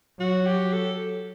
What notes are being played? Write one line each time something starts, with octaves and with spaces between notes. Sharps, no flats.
F#3 F#4
G4
A4